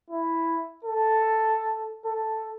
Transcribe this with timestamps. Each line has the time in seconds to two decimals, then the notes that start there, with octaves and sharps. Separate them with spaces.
0.10 E4
0.85 A4
2.05 A4